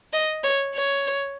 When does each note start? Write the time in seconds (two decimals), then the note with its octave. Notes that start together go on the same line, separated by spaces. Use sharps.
0.13 D#5
0.44 C#5
0.75 C#5